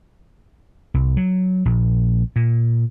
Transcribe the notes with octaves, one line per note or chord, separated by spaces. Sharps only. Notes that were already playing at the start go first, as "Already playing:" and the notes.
C2
F#3
A#1
A#2